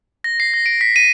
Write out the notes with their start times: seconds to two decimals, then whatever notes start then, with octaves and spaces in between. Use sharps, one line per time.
0.24 A#6
0.40 C7
0.54 A#6
0.66 D7
0.81 B6
0.96 D#7